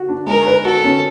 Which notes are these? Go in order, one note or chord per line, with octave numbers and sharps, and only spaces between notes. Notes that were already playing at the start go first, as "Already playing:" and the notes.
Already playing: F#4
D4
G#3 A#4
B4
F#4 A4
C#4